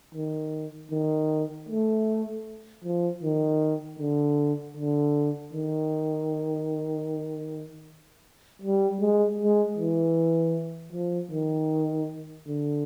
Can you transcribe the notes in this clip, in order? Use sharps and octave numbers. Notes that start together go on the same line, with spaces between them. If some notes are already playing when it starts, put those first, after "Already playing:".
D#3
D#3
A3
F3
D#3
D3
D3
D#3
G3
G#3
G#3
E3
F3
D#3
D3